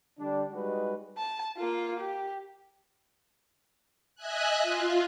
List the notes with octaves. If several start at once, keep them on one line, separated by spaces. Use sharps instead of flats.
D3 G3 D4
G3 G#3 D#4 F#4 B4
A5
A#3 F4
G4
D#5 E5 G#5 F#6
F4